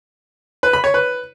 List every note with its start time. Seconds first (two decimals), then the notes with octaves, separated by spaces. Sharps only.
0.63 B4
0.73 B5
0.84 C#5
0.94 B4